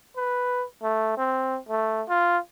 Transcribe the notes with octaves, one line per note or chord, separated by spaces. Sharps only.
B4
A3
C4
A3
F4